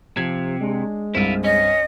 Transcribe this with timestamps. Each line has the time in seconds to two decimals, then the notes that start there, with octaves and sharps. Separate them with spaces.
0.17 C3 F3 G#6
0.61 G#3 D4
1.15 C2 G2 C4 E4 F4
1.44 C#4 D#5